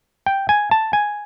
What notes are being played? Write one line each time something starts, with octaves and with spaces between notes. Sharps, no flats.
G5
G#5
A5
G#5